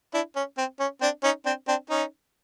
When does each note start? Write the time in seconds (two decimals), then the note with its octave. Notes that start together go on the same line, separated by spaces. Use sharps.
0.14 D4 E4
0.36 C#4
0.58 C4
0.80 C#4
1.01 C4 D4
1.24 C#4 D#4
1.45 C4 D4
1.68 C4 D4
1.90 C#4 D#4